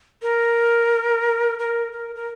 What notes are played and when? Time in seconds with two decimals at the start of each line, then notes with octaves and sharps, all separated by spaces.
0.22 A#4
1.59 A#4
1.92 A#4
2.15 A#4